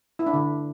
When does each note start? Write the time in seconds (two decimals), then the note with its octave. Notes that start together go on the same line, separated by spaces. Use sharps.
0.19 E4
0.26 D4
0.34 D3